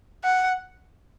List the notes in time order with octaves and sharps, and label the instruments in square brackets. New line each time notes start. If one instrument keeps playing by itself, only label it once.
[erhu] F#5